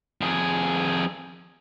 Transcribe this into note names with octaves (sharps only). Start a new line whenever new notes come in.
F2 G#4